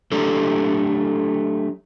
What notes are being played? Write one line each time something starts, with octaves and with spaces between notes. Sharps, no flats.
F#3 A3 D4 G4 A4